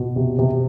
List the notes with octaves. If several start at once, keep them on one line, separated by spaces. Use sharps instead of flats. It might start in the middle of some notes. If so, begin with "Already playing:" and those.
Already playing: B2
C3
C3